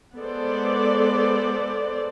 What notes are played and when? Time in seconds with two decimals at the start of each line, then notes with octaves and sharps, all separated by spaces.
0.17 G#3 B3 A4 C5 D5